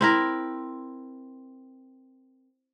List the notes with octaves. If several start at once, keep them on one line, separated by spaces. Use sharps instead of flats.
C4 E4 A#4